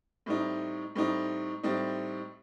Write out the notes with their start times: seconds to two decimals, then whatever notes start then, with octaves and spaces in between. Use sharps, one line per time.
0.26 A2 G3 C4 D#4
0.95 A2 G3 C4 D#4
1.63 A2 G3 C4 D#4